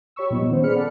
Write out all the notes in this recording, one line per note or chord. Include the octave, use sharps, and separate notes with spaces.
G4 C#5 B5 C#6 E6
A#2 F3 G3 B3 D#4
D#3 B3 C#4 C5
G#4 D5 B5 F6 C#7
A4 D5 F#5